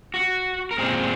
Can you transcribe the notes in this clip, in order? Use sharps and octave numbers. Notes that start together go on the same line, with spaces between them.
F#4
A#4
A#2 G#3 C4 G#4